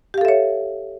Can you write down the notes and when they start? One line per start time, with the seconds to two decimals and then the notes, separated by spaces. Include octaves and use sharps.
0.14 G4
0.18 F5
0.21 A4
0.25 E5
0.28 C#5